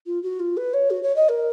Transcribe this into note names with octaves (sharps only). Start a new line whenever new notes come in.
F4
F#4
F4
B4
C#5
F#4
C#5
D#5
A#4